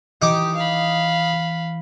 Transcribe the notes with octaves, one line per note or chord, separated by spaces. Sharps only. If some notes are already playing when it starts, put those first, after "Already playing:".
E3 D#4 G4 D6
F5 B5